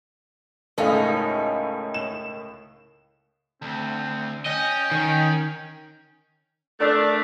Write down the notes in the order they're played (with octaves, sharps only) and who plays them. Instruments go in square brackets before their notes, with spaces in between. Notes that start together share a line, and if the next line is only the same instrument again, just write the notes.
[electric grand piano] C#2 A2 [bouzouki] C#4 D#4 [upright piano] A4 F5 [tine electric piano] A#4 D#5
[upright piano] E7
[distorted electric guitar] D2 [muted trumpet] C4
[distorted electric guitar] C#4 [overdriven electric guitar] D#5 [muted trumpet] G5
[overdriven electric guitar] D#3
[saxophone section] A3 D4 [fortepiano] A4 A#4 D5